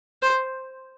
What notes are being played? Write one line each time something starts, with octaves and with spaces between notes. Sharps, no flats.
C5